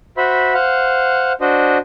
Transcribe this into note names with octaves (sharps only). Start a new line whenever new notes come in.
F#4 C5 E5 B5
C5 F5 F#5
D4 F#4 C5 D#5